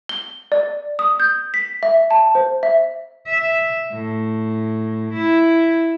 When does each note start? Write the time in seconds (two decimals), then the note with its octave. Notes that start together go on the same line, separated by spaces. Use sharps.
0.09 G7
0.52 D5
0.99 D#6
1.20 G6
1.54 B6
1.83 E5
2.11 A5
2.35 C5
2.63 E5
3.27 E5
3.92 A2
5.13 E4